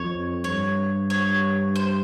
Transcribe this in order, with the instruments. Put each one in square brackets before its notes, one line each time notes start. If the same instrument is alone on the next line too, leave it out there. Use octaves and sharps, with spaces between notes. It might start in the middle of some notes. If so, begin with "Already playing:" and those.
Already playing: [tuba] F2 [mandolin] C#5
[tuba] G2 [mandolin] C#5
[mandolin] C#5
C5